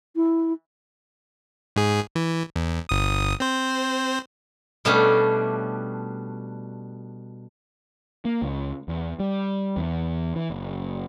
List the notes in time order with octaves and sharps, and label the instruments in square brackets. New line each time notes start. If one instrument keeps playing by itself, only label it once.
[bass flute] E4
[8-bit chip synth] G#2 G#4
E3
E2
G1 D#6
C4 C5
[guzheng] B2 G3 A3 C#4 D4
[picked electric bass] A#3
C#2
E2
G3
E2
E3
F#1